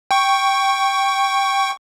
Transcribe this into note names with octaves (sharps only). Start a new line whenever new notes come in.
G5 C#6